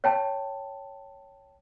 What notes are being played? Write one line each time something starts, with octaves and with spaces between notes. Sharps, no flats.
C#5 G5 A5